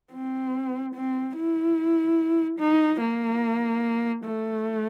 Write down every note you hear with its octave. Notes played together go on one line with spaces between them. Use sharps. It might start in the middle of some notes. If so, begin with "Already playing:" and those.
C4
C4
E4
D#4
A#3
A3